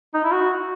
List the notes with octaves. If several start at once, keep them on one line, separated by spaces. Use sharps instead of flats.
D#4
E4
F#4